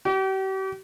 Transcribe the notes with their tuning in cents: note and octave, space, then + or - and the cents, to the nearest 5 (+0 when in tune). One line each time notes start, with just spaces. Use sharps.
G4 -40